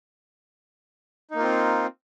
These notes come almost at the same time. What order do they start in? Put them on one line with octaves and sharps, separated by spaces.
D#4 A#3 F4 C4